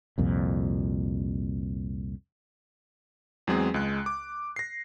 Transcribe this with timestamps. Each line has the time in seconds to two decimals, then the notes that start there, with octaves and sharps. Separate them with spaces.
0.18 C2 F2 A#2
3.47 E2 F#3 G#3 C4 G#4
3.74 C#2 G#3 F#6
4.06 D6
4.56 A#6 C7